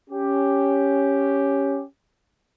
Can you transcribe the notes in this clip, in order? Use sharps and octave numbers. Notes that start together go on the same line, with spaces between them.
C#4 G4